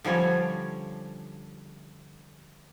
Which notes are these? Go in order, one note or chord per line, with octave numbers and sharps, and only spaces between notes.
D3 F3 G3 C#4 C#5